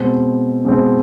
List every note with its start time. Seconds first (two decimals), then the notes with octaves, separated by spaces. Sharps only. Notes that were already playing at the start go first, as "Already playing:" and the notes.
Already playing: B2 G#3 C4
0.65 B2 G#3 C4